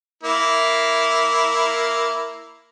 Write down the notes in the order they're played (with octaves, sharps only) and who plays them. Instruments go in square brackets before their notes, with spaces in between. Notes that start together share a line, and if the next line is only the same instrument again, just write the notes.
[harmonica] A#3 E4